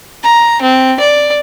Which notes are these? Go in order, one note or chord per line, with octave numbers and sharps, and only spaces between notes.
A#5
C4
D5